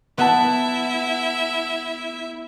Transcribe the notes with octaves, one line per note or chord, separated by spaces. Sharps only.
B3 E4 E5 F#5 A5